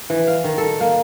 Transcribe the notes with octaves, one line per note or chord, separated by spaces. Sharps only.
E3
F5
D#3
A4
A#3